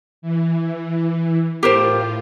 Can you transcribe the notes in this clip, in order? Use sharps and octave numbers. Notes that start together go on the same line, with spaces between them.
E3
A2 F4 G4 A#4 C5